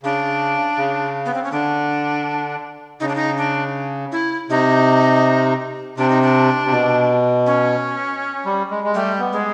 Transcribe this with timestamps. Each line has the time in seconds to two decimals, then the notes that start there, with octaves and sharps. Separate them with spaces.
0.03 C#3 D4
0.78 C#3
1.25 B3
1.34 C4
1.44 C#4
1.52 D3 D4
3.00 C#3 D#4
3.09 D4
3.15 D#4
3.37 D4
4.12 E4
4.50 C3 D#4
5.98 C3 D4
6.10 D#4
6.22 D4
6.66 C3
6.72 B2
7.46 C#4
8.45 G3
8.71 G#3
8.84 G#3
8.94 G3 A3
9.19 B3
9.33 G#3